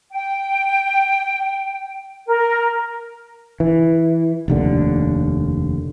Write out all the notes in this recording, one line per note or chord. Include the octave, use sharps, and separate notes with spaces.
G5
A#4
E3
F1 D#2 D3